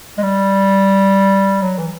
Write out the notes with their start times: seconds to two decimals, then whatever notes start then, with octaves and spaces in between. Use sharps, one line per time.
0.18 G#3
0.23 G3
1.62 F#3
1.78 E3